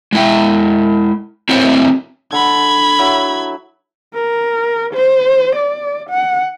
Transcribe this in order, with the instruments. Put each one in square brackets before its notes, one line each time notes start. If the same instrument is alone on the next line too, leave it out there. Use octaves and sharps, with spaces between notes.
[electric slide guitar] G#3 E4 G5
C4 E4 F#4 C5 C#5 F#5
[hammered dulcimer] D3 A4 [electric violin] B5 G#6
[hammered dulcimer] F#3 E4
[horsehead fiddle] A#4
C5
D5
F#5